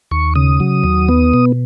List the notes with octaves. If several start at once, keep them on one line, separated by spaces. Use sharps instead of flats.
D#2 C#6
C#3 D#6
F#3
D#2
B3
B2